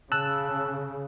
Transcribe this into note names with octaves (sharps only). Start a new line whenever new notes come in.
C#3 A5 E6 F#6